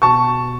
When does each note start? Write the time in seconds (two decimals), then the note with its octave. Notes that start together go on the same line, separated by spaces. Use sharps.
0.02 B2 A5 C#6